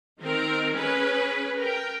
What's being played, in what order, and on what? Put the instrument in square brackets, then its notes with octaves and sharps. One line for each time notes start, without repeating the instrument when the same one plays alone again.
[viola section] D#3 C4 A#4
C#4 G#4 B4
A#4 G5